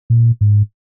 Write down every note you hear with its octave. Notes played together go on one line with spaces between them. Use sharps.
A#2
G#2